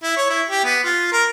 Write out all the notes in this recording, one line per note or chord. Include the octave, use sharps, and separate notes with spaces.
E4
C#5
E4
G4
B3
F4
A#4